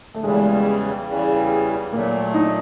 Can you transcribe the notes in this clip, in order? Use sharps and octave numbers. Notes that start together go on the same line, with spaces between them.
A3
E2 C#3 E3 G3 G#3
E2 C#3 E3 G3
A#2 F#3 A3 A#3
D#4